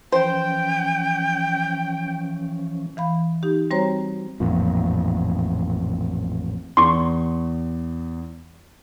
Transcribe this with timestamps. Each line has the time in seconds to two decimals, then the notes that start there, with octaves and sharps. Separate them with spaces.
0.12 E3 F3 C#4 C5 G5
2.97 E3 F5 B5
3.43 D#4 G4
3.71 G3 C4 F#4 C5 C#5 A#5
4.40 A1 F2 A#2
6.77 E2 C6 C#6